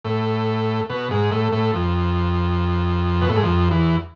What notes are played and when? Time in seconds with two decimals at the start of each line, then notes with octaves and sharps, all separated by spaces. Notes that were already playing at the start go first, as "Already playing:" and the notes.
0.05 A2
0.89 B2
1.11 G#2
1.32 A2
1.52 A2
1.73 F2
3.21 B2
3.29 A2
3.36 G#2
3.43 F2
3.71 E2